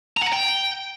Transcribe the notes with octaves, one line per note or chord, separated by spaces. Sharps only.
A#5
F#5
A#5
G5